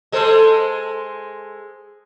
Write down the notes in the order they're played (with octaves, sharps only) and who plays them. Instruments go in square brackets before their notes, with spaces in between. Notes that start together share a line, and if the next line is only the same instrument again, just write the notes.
[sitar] G#3 A4 C5